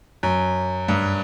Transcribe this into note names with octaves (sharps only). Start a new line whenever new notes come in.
F#2
G2